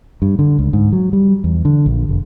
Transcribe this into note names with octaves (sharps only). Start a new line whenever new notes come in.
G2
D3
C#2
G#2
F#3
G3
E2
D3
A#1
F1